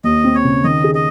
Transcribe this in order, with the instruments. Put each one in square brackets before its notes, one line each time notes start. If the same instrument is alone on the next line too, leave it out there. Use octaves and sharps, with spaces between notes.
[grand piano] D#2 [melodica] D#5
[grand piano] C4
[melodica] C#5
[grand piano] C#3
[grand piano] D#3 [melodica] D#5
[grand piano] G#4
[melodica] D#5